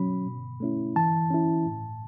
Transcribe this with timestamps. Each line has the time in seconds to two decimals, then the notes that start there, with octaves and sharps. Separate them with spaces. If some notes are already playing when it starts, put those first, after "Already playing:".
Already playing: B2 F#3 C#4 B5
0.26 B2
0.60 A3 C#4 E4
0.96 E3 A5
1.30 C#4 E4
1.65 A2